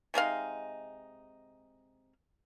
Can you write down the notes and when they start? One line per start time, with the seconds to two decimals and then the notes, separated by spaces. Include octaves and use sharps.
0.14 C3 G#3 D#4 F5